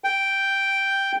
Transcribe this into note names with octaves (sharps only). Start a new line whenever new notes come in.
G5